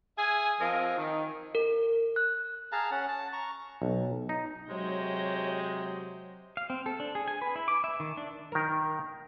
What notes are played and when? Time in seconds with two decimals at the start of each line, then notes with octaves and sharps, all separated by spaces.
0.18 G#4 E5 G#5
0.61 F3 C4 F4 A#4 D#5
0.98 D#3
1.55 A#4
2.16 F#6
2.72 G#4 F5 A5 A#5
2.91 C#4 F#5
3.08 A5
3.33 A#5 C#6
3.82 B1
4.29 D#4
4.70 C3 F#3 G#3 C#5 G6 A#6
6.57 F5
6.70 C4
6.86 A4
7.00 D4
7.15 G#4
7.28 G#5
7.41 B4
7.56 E4
7.68 D6
7.84 E5
8.00 D#3
8.17 D4
8.52 D#3 A#4